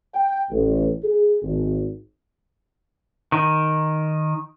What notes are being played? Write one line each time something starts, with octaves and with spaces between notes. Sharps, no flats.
G5
A1
G#4
G#1
D#3